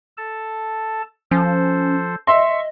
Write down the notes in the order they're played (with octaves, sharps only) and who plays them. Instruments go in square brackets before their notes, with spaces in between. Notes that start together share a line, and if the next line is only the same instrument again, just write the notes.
[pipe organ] A4 A5
[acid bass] F3 [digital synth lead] C#4 [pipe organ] A4 C5
[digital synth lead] D#5 [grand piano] E5 C6 [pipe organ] C#6